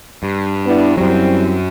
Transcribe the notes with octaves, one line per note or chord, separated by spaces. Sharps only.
G2
B3 D4 E4
F#2 F#3 G3 C4 E4